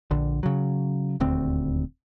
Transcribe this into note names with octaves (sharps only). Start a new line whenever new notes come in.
A#1 D3
C#3 F#3
D#1 D2 C4